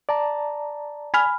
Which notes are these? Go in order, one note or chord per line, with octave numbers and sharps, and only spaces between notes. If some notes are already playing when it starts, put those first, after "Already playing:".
D5 A5 A#5
G#5 B5 F6